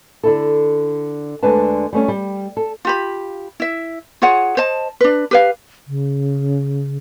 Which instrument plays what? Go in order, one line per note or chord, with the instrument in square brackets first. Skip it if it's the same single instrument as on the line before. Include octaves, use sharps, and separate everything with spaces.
[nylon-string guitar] D3 E4 A4
D2 D3 G#3 B4 A5
G3 A3 C4 C#4
G3
A4
[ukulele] F4 G4 B5
E4 E5
F4 G#4 C#5 F#5
C5 D#5 A5
D4 B4
G4 B4 F5
[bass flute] C#3